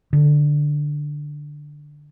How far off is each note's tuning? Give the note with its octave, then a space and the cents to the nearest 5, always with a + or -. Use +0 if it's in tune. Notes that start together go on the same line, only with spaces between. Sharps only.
D3 +5